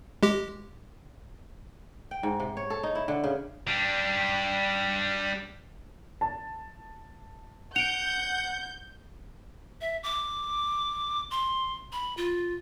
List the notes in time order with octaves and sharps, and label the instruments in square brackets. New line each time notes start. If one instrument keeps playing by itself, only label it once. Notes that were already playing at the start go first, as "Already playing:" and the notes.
[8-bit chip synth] G#3 G4
[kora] G5
G#2
C3
C#5
A4
D#4
E4
D3
C#3
[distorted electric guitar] G3 D4
[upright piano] A5
[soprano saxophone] F#5 [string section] G6 [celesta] D7 F7
[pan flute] E5
D6
C6
B5
F4